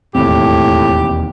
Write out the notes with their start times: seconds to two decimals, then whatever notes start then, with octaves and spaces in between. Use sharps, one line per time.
0.15 E1 D#2 A2 C4 G4